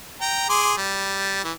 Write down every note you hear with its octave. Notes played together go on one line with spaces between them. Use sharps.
G5 A#5
G#4 C6 D6
G3
E3